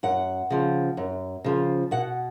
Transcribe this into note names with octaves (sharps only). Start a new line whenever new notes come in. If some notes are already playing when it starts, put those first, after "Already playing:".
F#2 F#5
C#3 F3
F#2
C#3 F3
B2 F#5